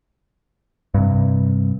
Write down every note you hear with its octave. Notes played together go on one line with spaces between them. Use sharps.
G2 C3